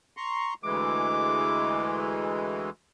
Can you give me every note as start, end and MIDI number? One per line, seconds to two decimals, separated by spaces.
0.17 0.54 82
0.17 0.54 84
0.17 0.54 85
0.64 2.70 38
0.64 2.70 52
0.64 2.70 56
0.64 2.18 86